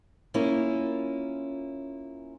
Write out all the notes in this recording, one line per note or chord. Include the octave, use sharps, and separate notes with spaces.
A#3 C#4 E4 F4